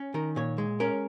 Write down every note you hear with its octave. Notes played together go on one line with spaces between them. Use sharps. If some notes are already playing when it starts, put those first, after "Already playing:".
Already playing: C#4
D#3 A#4
A#2 C#5
G#3
C#4 A#4